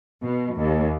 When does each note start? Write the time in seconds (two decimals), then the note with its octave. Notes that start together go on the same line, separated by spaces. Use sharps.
0.22 B2
0.56 D#2